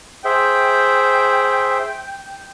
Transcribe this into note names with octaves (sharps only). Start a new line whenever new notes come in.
G#4 C5 E5 G5